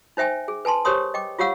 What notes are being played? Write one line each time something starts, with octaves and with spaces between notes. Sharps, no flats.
D#4 C5 E5 G5 G#5
G#4
B4 G#5 A5 C6
G4 A#4 C5 C#5 C6 D#6
D#5 G5 D6
F4 G4 C#5 F5 F#5 E6